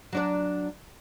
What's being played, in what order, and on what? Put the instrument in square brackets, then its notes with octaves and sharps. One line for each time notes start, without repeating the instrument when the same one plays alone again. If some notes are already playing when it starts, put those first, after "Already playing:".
[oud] F#3 D4 D5